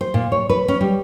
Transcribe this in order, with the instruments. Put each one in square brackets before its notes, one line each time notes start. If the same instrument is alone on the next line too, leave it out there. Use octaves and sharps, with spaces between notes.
[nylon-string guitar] C5
A#2
C#5
B4
C#4
G3